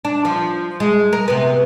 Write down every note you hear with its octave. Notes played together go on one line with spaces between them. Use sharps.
D4
F3
G#3
A#4
C3 B3